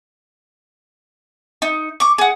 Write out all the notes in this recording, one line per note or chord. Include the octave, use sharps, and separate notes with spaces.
D#4
C#6 D6
G#4 F#5